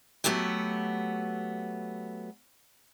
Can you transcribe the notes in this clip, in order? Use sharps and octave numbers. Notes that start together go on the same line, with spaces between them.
F#3 A3 B3 F#4 G4